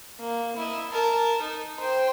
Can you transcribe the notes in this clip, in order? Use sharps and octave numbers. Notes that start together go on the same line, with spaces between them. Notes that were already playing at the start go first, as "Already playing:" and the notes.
A#3
E4 D#5
A#4 A5
D#4
C5 G5